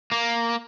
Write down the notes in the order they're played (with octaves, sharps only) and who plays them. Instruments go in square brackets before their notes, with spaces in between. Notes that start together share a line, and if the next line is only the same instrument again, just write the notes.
[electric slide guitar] A#3